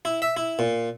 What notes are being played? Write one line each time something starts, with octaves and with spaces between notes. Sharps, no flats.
E4
E5
E4
A#2